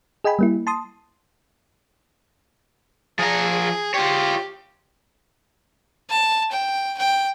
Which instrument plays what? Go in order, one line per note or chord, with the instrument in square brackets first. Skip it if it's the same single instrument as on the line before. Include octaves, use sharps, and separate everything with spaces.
[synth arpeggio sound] G#4 D#5 G5 G#5 B5
G3 A#3 E4
A5 C6 D#6
[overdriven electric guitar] F3 A#5 [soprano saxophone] G#4
[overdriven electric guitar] F4 C#5 [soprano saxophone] G4
[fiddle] A5
G5
G5